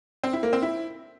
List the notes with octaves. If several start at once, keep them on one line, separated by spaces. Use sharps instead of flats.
C4
E4
A#3
C4
E4